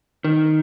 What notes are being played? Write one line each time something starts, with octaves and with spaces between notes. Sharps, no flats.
D#3